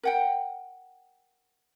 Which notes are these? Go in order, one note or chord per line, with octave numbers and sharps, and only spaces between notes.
A#4 F#5 G5